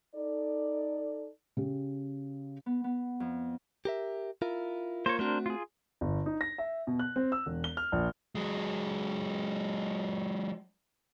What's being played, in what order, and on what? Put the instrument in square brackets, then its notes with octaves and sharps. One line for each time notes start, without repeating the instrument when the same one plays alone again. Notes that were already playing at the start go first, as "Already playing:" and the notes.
[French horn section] D#4 A4 D5
[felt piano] C#3 G4
[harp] B3
B3
F2
[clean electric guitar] G4 A#4 E5
E4 F4 A#4
[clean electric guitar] A#3 F4 A#4 [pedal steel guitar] C5 C#5
[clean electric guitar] A3 C4 F#4 [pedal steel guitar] D4 A#4 C5
[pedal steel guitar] F4 G#4
[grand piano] G1
D#4
A#6
E5
B2
F#6
C4
E6
E1
G7
F6
A#1
[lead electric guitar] F#3 G#3